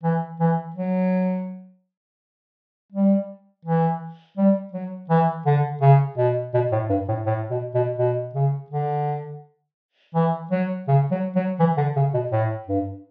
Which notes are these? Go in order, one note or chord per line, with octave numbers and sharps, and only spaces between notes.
E3
E3
F#3
G3
E3
G3
F#3
E3
D3
C#3
B2
B2
A2
G2
A2
A2
B2
B2
B2
C#3
D3
E3
F#3
C#3
F#3
F#3
E3
D3
C#3
B2
A2
G2